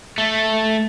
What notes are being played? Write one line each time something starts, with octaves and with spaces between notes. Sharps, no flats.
A3